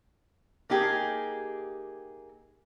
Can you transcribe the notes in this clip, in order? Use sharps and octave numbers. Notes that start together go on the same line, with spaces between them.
A#3 D#4 G4 G#4